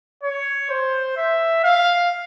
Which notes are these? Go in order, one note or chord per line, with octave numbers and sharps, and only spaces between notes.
C#5
C5
E5
F5